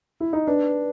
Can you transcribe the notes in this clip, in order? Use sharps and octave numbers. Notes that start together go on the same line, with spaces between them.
E4
D#4
D4 B4